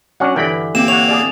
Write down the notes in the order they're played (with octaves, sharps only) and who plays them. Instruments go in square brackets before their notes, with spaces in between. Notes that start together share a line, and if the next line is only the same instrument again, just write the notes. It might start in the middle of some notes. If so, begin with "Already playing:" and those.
[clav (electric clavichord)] F#3 C#4 D4 [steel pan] F#5
[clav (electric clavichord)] G2 D3 E3 [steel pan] G5 B5
[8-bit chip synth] A#3 C4 [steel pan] G4 [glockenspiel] E7
[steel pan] C#5 F#5 [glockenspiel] F7
[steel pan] G#4 D5